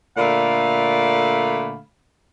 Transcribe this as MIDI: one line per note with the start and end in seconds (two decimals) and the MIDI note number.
0.18 1.81 46
0.18 1.81 50
0.18 1.81 57
0.18 1.81 77
0.18 1.81 83